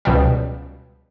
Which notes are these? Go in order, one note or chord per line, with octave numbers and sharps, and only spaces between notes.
C#2 B2 F3 G3